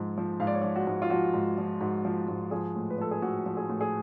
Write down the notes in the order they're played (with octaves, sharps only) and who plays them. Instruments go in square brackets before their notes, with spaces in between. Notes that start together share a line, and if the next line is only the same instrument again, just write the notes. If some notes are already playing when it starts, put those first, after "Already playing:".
Already playing: [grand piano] G#2 F3
F3
G#2 F5
D5
C#5
F3 D5
F#4
G#2
F4
F3 F#4
G#2
F3
G#2 F#4
F3
G#2
F3 G#4
A2
B4
F3 A4
G#4
A2 F#4
F3
G#4
A2
G#4